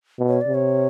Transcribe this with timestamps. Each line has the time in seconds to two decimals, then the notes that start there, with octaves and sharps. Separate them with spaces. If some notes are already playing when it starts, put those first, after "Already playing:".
0.19 B2
0.28 C#5
0.41 D5
0.47 C3
0.54 C#5